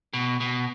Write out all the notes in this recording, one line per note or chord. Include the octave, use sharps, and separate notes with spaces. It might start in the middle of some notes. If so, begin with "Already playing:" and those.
B2
B2